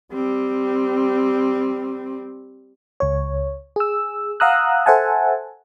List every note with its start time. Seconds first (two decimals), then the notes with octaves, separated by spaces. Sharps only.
0.13 G3 C4
3.00 C#2 C#5
3.76 G#4 E6
4.40 F5 F#5 A#5 D#6 E6 F#6
4.86 A4 C5 E5 F#5 G#5 A5